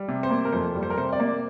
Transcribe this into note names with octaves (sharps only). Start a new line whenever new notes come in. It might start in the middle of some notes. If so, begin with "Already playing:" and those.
Already playing: G3
C3
C5
A#3
A#4
F2 C5
G3
C5
A#4
C3 C5
D5
A#3